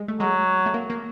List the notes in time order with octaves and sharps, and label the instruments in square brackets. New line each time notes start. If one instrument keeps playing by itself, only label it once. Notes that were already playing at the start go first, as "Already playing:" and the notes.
Already playing: [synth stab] G3 G#3
A3
[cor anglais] F#3 [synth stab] G#3
[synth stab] A3
A#3
A#3